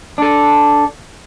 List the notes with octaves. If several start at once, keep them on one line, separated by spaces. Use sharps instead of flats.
D4 A4